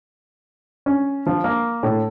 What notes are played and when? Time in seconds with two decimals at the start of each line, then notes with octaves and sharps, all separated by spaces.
0.86 C#4
1.26 F3
1.44 A#3
1.83 A2